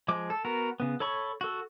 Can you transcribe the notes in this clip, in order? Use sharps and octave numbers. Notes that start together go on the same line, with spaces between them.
F3 G#3 D6
A4
B3 F#4 A#4
C#3 B3
A4 C#5 B5 C#6
F#4 A4